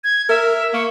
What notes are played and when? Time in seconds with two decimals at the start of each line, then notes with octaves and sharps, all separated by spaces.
0.04 G#6
0.29 A#4 E5
0.74 A#3 C#6